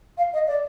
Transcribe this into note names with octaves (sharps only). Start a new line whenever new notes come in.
F5
D#5
D5